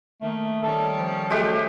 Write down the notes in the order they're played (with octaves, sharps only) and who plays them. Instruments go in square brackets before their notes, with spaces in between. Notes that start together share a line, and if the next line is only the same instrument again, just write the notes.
[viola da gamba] D#3 A#3 [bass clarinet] A3
[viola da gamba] D#3 G3 C#4 [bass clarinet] A4
[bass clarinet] F3
[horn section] F#3 A3 [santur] G#3 G4